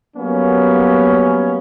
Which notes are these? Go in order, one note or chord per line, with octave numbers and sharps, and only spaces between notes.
F#3 G3 A#3 B3 C#4